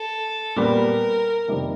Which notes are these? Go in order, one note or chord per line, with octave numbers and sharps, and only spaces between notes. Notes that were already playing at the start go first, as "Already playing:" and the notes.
Already playing: A4
A#2 G3 B3 A#4
F2 C3 D#3 G3 A#3